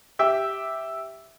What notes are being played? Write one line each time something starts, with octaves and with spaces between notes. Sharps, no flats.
G4 E5 G5